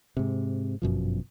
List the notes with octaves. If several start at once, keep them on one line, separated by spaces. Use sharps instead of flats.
G#2 C3
G1 F#2 B2 F3